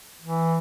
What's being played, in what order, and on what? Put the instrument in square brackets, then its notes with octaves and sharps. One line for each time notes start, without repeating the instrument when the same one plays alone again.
[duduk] E3